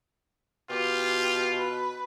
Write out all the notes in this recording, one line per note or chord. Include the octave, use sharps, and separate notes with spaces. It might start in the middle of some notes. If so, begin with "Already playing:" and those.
B2 F4 G4
B4